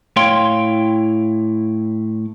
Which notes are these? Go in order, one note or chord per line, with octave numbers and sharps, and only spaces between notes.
A2 E4 C#5 F5 G5 C6